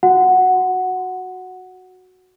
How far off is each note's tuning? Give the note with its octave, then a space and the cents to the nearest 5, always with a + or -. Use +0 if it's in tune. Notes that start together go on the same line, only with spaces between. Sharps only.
F#4 -5 F#5 +0